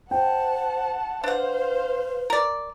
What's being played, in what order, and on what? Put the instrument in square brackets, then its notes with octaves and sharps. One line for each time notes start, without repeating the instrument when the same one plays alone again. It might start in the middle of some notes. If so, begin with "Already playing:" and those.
[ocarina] C5 [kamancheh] F#5 A5 [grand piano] G5
[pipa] D4 F#5 [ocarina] B4 [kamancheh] C5 F5
[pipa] A#4 D5